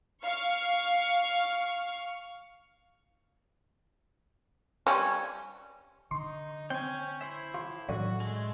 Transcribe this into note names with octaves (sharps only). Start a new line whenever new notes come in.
F5 C#6 F6
G3 C#4
D3 D#4 C6
C4 C#4 G5 G#5
E4 C5 E5
A2 F4
F#2 A2 D3 D#3 F#4
G#3 A3